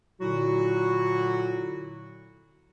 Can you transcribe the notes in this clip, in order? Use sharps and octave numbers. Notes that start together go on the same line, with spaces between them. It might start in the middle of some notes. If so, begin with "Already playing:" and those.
A#2 D3 F#3 E4 F#4